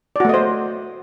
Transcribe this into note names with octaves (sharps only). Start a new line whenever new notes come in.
A3 F#4 C5 D5 D#5